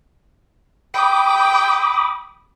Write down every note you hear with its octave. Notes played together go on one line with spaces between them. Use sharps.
G5 B5 D6 D#6